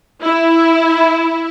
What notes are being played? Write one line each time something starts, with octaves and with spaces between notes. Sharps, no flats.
E4